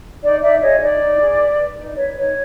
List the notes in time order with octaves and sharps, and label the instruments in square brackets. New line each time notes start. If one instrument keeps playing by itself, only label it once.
[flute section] D#4 D5
D#4 D5 E5
G#4 C#5 D#5
D#4 D5
D#4
G#4
B4
B4
D#4
B4 C#5
D#4 C#5